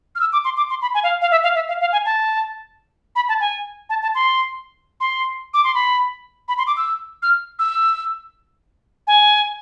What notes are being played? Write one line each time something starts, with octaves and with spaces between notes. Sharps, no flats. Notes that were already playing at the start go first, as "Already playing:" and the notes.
F6
E6
D6
C6
D6
C6
B5
G#5
F5
F5
E5
F5
E5
F5
F5
G#5
A5
B5
A5
G#5
A5
A5
C6
C6
D6
C6
B5
B5
C6
D6
E6
F6
E6
G#5